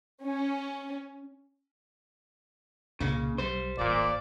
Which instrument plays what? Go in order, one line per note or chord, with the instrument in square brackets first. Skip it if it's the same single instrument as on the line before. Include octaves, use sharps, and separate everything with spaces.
[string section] C#4
[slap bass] C2 A#2 A#3 [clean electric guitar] C#3
[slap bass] B1 G3 [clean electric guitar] C5
[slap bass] D1 G#1 [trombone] A#2 [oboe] D5